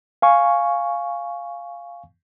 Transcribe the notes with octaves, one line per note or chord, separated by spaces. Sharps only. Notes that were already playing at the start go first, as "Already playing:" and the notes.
F5 G#5 C#6